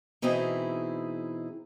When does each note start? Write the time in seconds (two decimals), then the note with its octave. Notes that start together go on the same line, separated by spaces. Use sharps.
0.22 B2 E3 C4 D#4 E4 G#4